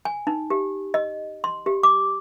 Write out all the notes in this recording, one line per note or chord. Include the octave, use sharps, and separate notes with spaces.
G#5
D#4
G4
D#5
C6
G4
D6